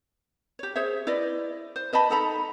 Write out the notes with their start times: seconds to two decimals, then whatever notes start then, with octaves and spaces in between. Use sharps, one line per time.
0.59 G4 C#5
0.75 G#4 C5 C#5 E5
1.07 E4 B4 D5 D#5
1.76 C5
1.93 B4 D#5 A5 B5
2.10 D#4 A4 A#5 B5